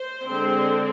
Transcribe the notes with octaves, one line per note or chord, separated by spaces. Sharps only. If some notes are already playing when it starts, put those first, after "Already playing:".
Already playing: C5
D3 G#3 C4